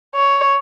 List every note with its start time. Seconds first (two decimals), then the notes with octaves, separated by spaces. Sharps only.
0.15 C#5